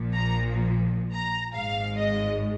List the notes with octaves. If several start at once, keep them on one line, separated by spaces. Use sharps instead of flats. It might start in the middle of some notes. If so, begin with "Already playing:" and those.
Already playing: A#1 A#2 F3
A#5
A#5
G#1 G#2 G#3 F5
D#5